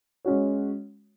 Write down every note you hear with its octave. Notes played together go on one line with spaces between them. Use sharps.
G#3 C#4 F#4 C#5